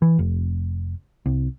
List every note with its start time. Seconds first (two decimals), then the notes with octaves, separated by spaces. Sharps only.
0.02 E3
0.19 F1
1.26 C2